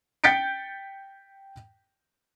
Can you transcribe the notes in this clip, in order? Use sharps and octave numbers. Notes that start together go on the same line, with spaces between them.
G5 G6 A6 B6 C#7 D7